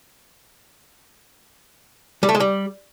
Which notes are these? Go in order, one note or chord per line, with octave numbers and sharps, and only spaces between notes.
G3
A3
G#3
G3